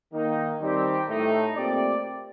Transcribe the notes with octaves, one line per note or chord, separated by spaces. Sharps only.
D#3 A#3 D#4
D#3 G3 C4 G4
A2 A3 D#4
A#2 A3 C4 G4 D5